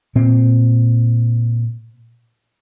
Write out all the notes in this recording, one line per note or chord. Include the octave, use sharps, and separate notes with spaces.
A#2 C4